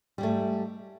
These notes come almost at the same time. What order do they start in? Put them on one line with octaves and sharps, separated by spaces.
G3 G#2 A3